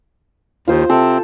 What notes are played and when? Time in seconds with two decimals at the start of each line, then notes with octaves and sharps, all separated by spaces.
0.68 D#2 F4 C5
0.90 C3 C4 A4